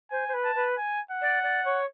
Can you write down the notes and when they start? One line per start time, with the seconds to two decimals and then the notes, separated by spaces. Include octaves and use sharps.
0.11 C5 G#5
0.28 C5
0.33 B4
0.45 A5
0.55 B4
0.78 G#5
1.11 F#5
1.21 D5
1.43 D5
1.65 C#5